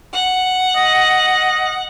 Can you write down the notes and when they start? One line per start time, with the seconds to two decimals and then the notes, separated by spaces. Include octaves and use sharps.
0.13 F#5
0.76 D#5